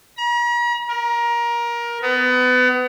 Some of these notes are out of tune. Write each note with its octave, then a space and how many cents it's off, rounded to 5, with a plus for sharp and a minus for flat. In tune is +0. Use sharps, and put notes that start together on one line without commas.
A#5 +45
A#4 +20
B3 +30